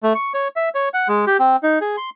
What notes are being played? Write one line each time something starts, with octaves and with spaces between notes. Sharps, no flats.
A3
C#6
C#5
E5
C#5
F#5
G#3
G4
C4
D#4
G#4
C6